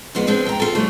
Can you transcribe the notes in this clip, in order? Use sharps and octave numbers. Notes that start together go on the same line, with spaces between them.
F2 A#2 G#3 B3 F4
F3 G#3 B3 C4 D4
G5 A#5
F4 A4
C#3 F3 G3 A3 D4 F4